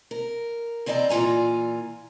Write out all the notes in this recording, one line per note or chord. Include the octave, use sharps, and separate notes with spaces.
A#4
E3 C4 D5 D#5 G5 A#5
A#2 E3 F4 G#5 A#5